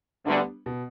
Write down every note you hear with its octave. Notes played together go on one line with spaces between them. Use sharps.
D2 D3 G3 B3 D4
B2